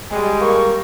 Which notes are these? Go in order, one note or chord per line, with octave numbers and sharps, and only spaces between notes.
G3 G#3 G#5
A#3 C#6